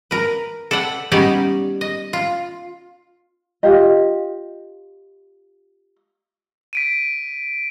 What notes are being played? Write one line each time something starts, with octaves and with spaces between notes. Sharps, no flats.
A#4 B4
A4 B4 D5 F#5 G5
G3 B3 C#4 D#4 G4 D5
D#5
F4
F4 G4 D#5
B6 D7 D#7